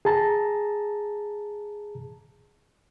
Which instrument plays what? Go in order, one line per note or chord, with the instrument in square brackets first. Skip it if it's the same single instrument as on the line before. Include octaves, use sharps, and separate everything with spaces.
[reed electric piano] G#4 A5 A#5